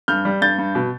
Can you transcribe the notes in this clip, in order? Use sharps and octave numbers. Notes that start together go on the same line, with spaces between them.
G2 F6 G6
G3
G2 G6 A6
G2
B2